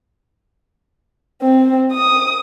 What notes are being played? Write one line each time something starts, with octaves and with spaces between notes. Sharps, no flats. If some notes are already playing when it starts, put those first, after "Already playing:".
C4
D#6